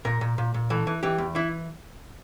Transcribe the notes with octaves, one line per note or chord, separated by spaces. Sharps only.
A#2 A#4
A#2
A#2
A#2
E3 A4
E3
E3 G4
E2
E3 E4